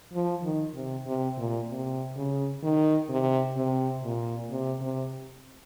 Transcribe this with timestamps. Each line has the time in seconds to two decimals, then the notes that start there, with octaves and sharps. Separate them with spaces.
0.13 F3
0.43 D#3
0.75 C3
1.06 C3
1.38 A#2
1.69 C3
2.16 C#3
2.63 D#3
3.09 C3
3.56 C3
4.03 A#2
4.50 C3
4.81 C3